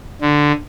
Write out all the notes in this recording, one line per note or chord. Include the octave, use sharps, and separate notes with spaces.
D3